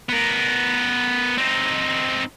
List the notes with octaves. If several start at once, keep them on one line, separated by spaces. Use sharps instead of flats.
B3 A#4
C4 D#4